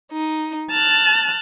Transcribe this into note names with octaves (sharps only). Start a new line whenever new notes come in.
D#4
A5 F6 F#6